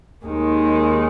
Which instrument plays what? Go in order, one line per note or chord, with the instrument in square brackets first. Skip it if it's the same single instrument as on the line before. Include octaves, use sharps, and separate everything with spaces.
[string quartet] D#2 D#3 G#3 D#4